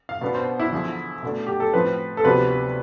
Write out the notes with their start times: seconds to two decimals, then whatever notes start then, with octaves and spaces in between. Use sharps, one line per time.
0.09 F5
0.21 B2 B3 D4
0.34 C5
0.60 E4
0.72 E2 D3 F3
1.23 B2 A3 D4
1.47 G4
1.60 A4
1.74 A2 F3 C4 B4
2.17 A4
2.24 D2 C3 F3 B3 D4 B4